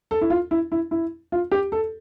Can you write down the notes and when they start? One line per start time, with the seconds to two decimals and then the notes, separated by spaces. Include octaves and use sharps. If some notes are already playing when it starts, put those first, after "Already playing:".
0.11 A4
0.21 E4
0.30 F4
0.51 E4
0.72 E4
0.91 E4
1.32 F4
1.51 G4
1.72 A4